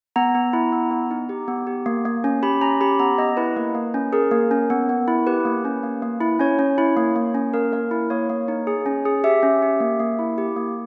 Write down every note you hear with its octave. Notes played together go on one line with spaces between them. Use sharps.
B3 A#5
B3
E4
B3
B3
D#4
G4
B3
G4
A#3
A#3
C#4
G4 B5
C#4 A#5
G4 B5
B3 A#5
B3 D#5
E4 B4
A#3 B4
A#3
C#4
G#4 A#4
A#3
C#4
B3
B3
E4
G4 B4
A#3
C#4
A#3
A#3
E4
C#4 C#5
C#4
E4
A#3
A#3
C#4
A#3 A#4
A#3 A#4
E4
A#3 C#5
A#3
D#4
G#4
C#4
G#4
G4 E5
C#4
G4
A#3
A#3
E4
G4
A#3